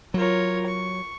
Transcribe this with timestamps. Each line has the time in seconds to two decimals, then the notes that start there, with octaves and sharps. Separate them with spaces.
0.14 F#3 F4 A#4 C#5
0.66 C#6